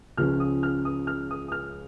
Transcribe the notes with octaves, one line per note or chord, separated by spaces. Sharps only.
C#2 C#3 F3 C#4 F6
D#6
F6
D#6
F6
D#6
D#6
F6